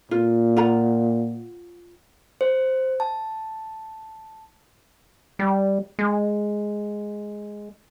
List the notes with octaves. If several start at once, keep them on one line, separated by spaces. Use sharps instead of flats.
A#2 F4
F4 F#5 A#5
C5
A5
G3
G#3